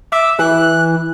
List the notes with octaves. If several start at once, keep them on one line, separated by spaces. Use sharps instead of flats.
E5 D6
E3 F#6